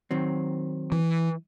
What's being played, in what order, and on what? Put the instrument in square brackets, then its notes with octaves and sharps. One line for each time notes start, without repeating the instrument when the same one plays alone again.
[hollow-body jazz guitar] D#3 F#3 C4
[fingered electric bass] E3